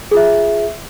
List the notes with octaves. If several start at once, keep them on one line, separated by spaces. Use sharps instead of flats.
F4 G#4 E5